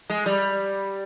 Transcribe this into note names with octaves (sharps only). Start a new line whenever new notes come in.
G#3
G3